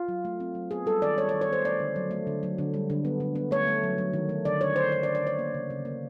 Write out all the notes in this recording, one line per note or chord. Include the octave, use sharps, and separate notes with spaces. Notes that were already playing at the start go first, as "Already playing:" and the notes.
Already playing: F4
F#3
A3
C4
F#3
B3 G#4
G3 A4
D#3 D5
G3 C#5
C#5
D#3
C#5
B3 C5
A3 D5
D3
F#3
A3
D3
F#3
D3
G3
D3
B3
D3
B3
A3 C#5
A3
F#3
F#3
D#3
A3
D3 D5
D3 C#5
F#3 C5
D3 C#5
D5
D3
D5
D3 C#5
A#3
C#3
C#3
A#3